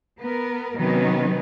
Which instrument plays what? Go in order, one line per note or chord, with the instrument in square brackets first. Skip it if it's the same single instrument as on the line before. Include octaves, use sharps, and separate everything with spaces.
[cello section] B3 A#4
C3 D#3 F#3 B3 C#4 D#4